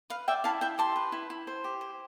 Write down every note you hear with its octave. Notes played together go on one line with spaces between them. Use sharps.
B4 F5
D5 E5 G5
E4 F5 A5
E4 E5 G5
G4 A5 C6
B4
E4
E4
C5
G4
C5